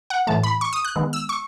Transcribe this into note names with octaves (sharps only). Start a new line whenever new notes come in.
F#5
A2 E3 A3 A5
B5
C#6
D#6
F#6
D#3 G#3 B3
E6
C#6